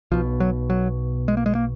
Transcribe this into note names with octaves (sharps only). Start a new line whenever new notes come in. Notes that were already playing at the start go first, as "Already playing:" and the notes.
B1 B2 F3
F#3
F#3
G#3
A#3
G#3
A#3